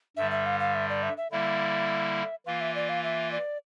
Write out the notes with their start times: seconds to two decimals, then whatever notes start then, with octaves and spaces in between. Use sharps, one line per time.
0.17 G2 D3 G3 E5
0.31 E5
0.46 F5
0.60 F5
0.75 E5
0.89 D5
1.03 E5
1.17 E5
1.31 D3 G3 A#3 E4 E5
2.46 E3 A#3 F4 F5
2.61 E5
2.75 D5
2.89 F5
3.03 E5
3.32 D5